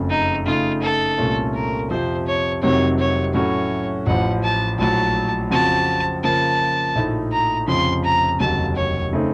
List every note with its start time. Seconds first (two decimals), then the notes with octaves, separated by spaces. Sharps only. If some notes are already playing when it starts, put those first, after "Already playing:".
Already playing: F#1 F2 C#3 A3
0.10 D#4
0.46 C#3 A3 D#4 F4
0.82 A4
1.18 C2 A#2 A3 C#4
1.54 A#4
1.90 F2 C3 F3 C5
2.26 C#5
2.62 F1 F2 C3 D#3 F#3 C#5
2.99 C#5
3.34 A2 F#3 A3 C#4 F#4 C#5
4.06 A1 A2 F3 F#5
4.43 A5
4.78 A#1 A2 F#3 A5
5.50 F2 C#3 F3 C4 F#4 A5
6.23 C#3 F3 A#3 A5
6.95 A#1 A2 A3 D#4
7.32 A#5
7.68 F1 F2 C#3 F3 C6
8.04 A#5
8.40 F1 D#2 C#3 F#3 A5
8.76 C#5
9.13 C#3 A3 C4 D#4